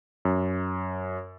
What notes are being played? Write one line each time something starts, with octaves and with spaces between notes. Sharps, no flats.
F#2